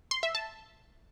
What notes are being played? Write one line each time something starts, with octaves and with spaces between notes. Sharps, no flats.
C6
E5
A5